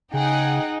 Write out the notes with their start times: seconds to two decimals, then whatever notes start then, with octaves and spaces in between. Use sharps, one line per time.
0.14 C#3 D#4 G#4 F#5 G5